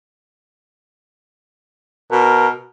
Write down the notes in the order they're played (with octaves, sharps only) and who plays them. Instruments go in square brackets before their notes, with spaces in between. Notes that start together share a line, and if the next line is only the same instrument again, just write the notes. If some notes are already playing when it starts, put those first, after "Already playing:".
[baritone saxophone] B2 [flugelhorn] A#4